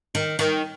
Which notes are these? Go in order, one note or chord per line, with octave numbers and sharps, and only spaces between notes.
D#3
D#3